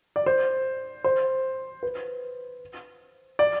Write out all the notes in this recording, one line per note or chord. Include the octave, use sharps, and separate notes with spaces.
D5
C5
C5
B4
D5